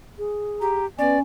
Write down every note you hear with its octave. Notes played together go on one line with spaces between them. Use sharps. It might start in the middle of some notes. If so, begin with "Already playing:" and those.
G#4
G4 A#5
B3 C#4 D5 G#5